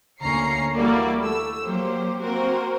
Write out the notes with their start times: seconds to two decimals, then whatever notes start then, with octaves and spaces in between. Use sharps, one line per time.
0.21 D2 A#3 C#4 A#5 C7 C#7
0.77 E3 G3 A#3 E4 F#4 D5
1.21 A3 E6
1.64 F#3 A#3 G4 C5
2.21 A#3 C4 F#4 A#4 C5